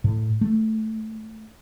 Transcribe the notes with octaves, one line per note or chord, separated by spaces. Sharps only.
A2
A3